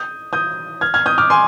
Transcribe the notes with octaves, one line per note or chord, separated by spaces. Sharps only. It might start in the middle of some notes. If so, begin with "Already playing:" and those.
Already playing: D#6 G6
D#6 G6
F6 G#6
F6 G#6
D#6 G6
D6 F6
G#5 C6